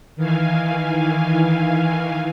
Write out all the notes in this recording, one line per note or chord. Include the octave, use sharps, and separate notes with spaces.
D#3 E3 F5 G#5